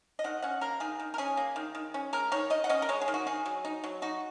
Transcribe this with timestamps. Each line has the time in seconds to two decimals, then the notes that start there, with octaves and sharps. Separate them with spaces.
0.19 D#5
0.24 D#3 F#5
0.42 C#4 F#5
0.61 A#3 A#4
0.80 D#3 G#4
1.00 D#3
1.14 A#4
1.18 C#4 G#4
1.37 A#3
1.56 D#3
1.75 D#3
1.94 C#4
2.13 G#3 A#4
2.32 D#3 C#5
2.50 D#3 D#5
2.64 F#5
2.69 C#4 D#5
2.82 A#4
2.89 G#3 C#5
3.02 G#4
3.08 D#3
3.14 F#4
3.27 D#4 G#4
3.46 F#3
3.65 D#4
3.84 F#3
4.02 D#4 F#4